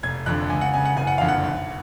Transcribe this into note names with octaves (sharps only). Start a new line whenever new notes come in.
F1 G#6
F2 D3 F#6
C#2 G#5
F#5
C#3 G#5
F#5
F#1 G#5
F#5
F2 D3 F5
F#5
B1